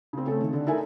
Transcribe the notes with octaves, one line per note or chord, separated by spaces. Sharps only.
C#3 C4
A3 C#4 A4
D#3
D3
D#4 E4 A4 A#4 E5 G#5